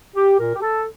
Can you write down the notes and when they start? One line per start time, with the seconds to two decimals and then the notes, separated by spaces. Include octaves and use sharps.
0.15 G4
0.38 A#2 A#4
0.55 G4
0.62 A4